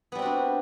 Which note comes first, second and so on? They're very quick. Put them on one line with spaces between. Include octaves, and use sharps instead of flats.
B3 G3 C4 F#4 D4